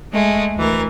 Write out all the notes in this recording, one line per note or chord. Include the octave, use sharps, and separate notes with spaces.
G#3 A3 G#4
D2 E3 A#4